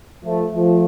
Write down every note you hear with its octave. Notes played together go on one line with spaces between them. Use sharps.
F3 A3
F3 A3